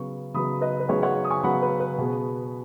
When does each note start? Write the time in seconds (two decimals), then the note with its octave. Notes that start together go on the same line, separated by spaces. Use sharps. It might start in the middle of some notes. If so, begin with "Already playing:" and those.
Already playing: C#3 F#3 B3 C#6
0.34 C#3 F#3 B3 B5 D#6
0.61 B4 D#5
0.80 B4
0.89 C#3 F#3 B3 G#4 C#5
1.02 C#5 F#5
1.24 D#6
1.30 G#5 C#6
1.43 C#3 F#3 B3 F#5 B5
1.62 B4
1.80 B4
1.98 B2 B3 G#4